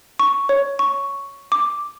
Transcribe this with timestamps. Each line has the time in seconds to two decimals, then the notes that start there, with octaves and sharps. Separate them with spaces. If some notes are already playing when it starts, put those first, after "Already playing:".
0.19 C#6
0.49 C#5
0.79 C#6
1.52 D6